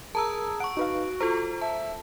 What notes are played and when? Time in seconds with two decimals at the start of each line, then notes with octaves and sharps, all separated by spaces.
0.15 G#4 A#4 A5 A#5 E6
0.60 F#5 C#6 D7
0.77 D#4 F#4 B4 F5
1.21 F4 A4 C5 A#5
1.61 E5 A5